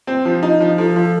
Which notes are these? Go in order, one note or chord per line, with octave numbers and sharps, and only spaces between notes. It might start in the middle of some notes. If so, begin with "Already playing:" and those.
C4
F3
D#4
F3
F3 A4
F3